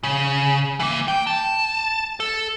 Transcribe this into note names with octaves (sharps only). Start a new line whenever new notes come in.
C#3
E3 A#3
G5
A5
A4